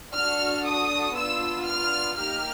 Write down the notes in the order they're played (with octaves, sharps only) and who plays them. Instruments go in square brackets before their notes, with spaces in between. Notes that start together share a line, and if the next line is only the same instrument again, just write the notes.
[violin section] D4 F#4 A4 F6
D#6
B3 D4 F4 E6
F6
A#3 D#4 G4 F6